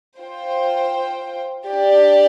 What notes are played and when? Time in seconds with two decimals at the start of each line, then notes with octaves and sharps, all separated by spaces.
0.19 F4 C5 G5
1.68 D4 G4 D5